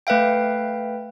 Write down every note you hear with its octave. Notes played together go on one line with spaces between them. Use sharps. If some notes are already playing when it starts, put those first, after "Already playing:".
A3 B4 E5 F5 G5